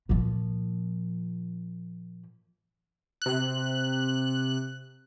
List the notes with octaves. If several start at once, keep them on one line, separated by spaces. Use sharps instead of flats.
A#2 F3
C3 F#6